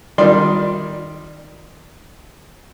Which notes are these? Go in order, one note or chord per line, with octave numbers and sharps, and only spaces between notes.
D#3 G3 D5 C6